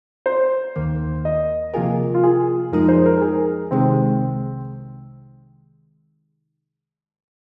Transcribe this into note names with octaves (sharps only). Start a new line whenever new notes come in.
C5
D#2 D#3 A#3
D#5
C3 F3 A#3 F4 G#4 A#4
F4
G#4
F2 F3 G#3 D#4 G#4 A#4
C5
A#4
A#4
G#4
C2 C3 D#3 G#3 C4